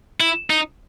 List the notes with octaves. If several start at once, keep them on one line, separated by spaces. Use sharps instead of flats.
E4
D#4